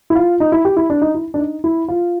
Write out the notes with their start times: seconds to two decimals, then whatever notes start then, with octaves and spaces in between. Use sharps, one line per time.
0.10 E4
0.15 F4
0.40 D#4
0.52 E4
0.65 G4
0.77 E4
0.90 D4
1.02 D#4
1.15 E4
1.34 D4
1.38 D#4
1.64 E4
1.88 F4